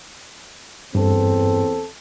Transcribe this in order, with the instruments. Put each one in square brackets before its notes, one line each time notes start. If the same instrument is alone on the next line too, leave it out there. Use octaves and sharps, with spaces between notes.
[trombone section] E2 C4 A4 [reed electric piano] G2